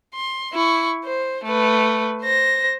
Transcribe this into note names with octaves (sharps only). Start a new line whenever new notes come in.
C6
E4 C#6
C5
A3 B4
C5 A#6